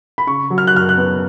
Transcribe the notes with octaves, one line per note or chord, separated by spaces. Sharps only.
B5
C#3 C#6
F#3
F6
F#6
F#2 F6
F#6
B3